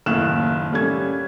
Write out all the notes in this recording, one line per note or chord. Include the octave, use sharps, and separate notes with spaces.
F#1 D#2 A2 F6 F#6 E7
G3 A3 C#4 G#6